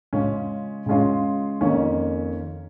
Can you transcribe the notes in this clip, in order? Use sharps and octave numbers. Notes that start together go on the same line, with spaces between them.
C#3 G#3 C#4 F4
C#3 G#3 C#4 F4
F2 D#3 A#3 C#4